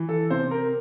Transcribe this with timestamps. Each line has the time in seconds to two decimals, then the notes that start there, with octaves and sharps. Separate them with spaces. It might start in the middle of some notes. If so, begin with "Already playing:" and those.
Already playing: E3
0.09 A4
0.30 C3 C5
0.51 A#4